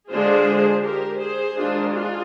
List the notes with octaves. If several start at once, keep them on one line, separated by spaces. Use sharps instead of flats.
D3 G#3 D4 F4 G#4 C5
G4 A#4
G#4 C5
D#3 G#3 D4 F4
F4 G#4